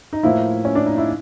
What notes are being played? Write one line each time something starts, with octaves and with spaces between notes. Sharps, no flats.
D#4
A2 F3 A#3 E4
C#4
D4
D#4
E4